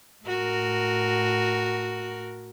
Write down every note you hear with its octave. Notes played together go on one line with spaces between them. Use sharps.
A2 F#4 A#4